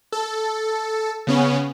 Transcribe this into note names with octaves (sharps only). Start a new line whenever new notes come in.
A4
C#3 B3 C#4